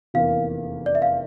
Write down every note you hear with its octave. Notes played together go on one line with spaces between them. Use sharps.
F1 E2 E3 A#3 F5
D5
E5
F5